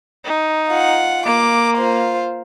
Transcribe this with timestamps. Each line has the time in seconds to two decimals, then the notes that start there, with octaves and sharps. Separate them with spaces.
0.25 D#4
0.69 F4 F#5
1.25 A#3 D6
1.76 F4 C5